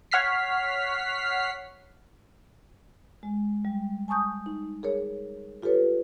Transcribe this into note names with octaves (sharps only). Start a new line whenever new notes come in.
C#5 F#5 F6 B6 C7
G#3
G3
G#5 A5 C#6 D#6 G6
D#4
G#4 A#4 C#5
F4 G4 A4 B4 C#5